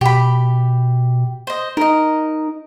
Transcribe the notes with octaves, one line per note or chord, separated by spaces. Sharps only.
B2 G4 B5
C5 D#5
D#4 A#4 D#5